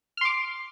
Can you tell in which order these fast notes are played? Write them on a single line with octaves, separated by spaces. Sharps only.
F6 C6 D6